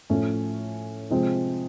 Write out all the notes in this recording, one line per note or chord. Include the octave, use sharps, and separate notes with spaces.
A2 F3 A3 C#4
C3 F3 G#3 C4